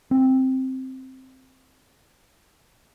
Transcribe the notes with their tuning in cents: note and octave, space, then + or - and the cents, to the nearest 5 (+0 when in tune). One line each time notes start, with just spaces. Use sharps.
C4 +0